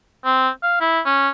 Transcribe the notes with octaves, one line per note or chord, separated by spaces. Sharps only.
C4
F5
E4
C#4